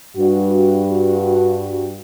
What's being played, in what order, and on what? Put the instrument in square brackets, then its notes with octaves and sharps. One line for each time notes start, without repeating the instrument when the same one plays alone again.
[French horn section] G2 F#4